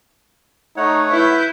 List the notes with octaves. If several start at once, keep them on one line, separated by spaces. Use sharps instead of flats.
A3 D#4 C#5 F#5
E4 B4 G6